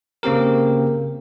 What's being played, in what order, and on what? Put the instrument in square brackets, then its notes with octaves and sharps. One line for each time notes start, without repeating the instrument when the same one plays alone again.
[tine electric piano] C#3 A#3 C4 G4 A#4